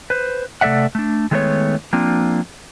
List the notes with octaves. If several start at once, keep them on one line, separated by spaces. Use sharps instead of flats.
B4 C5
C3 A3 A4 D5 E5 F#5
A3 D4
D#3 G#3 A3 B3 D4 C#5
F3 A#3 C4 D4 F4